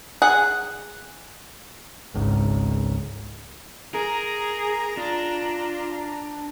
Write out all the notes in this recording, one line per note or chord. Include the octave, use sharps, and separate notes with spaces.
G#4 F#5
G#1 C#2 G#2
G#4 A#4 A#5
D4 F4